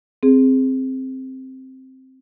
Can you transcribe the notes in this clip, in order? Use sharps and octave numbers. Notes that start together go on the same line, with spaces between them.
C4 G#4